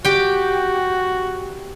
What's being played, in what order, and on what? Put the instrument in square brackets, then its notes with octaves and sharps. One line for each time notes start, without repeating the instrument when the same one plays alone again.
[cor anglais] F#4 [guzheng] G4 G5